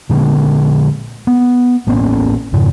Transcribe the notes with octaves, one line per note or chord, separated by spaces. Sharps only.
A#2 D3 G#3 B3
B3
A1 A#3 B3 C#4
F2 G#2 C#3